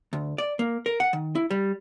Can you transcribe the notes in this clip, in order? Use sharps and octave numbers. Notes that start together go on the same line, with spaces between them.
D2
D5
A#3
A#4
F#5
D#3
E4
G3